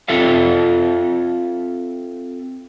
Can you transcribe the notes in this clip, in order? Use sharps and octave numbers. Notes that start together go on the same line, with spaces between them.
C4 F4 A4 E5 F5